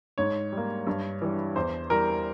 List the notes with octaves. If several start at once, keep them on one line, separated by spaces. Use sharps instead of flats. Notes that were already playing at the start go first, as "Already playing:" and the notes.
G#2 C#5
G3 A#3
G2
E3 G3
E2 C5
E3 G3 A#4